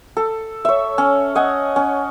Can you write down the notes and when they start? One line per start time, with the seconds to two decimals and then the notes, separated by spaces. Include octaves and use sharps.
0.17 A4
0.65 C#5 E5
0.98 C#4
1.35 D#5 F#5 G#5
1.76 C#4